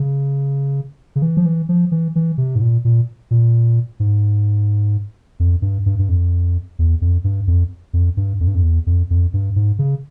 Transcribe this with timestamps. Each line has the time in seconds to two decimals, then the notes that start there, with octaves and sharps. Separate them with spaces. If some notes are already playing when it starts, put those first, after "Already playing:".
Already playing: C#3
1.16 C#3
1.22 E3
1.37 F3
1.46 E3
1.69 F3
1.92 E3
2.16 E3
2.38 C3
2.55 G#2
2.61 A#2
2.85 A#2
3.31 A#2
4.00 G#2
5.40 F2
5.62 G2
5.86 G2
5.99 G2
6.09 F2
6.79 E2
7.02 F2
7.24 G2
7.47 F2
7.93 F2
8.17 G2
8.40 F2
8.48 G2
8.55 F2
8.63 E2
8.87 F2
9.10 F2
9.34 G2
9.56 G#2
9.79 C#3